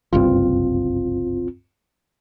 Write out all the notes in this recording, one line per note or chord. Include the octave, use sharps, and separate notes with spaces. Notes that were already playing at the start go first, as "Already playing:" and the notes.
F#1 C2 G2 C4 F4